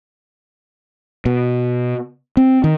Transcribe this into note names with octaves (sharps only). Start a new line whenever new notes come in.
B2
C4
D#3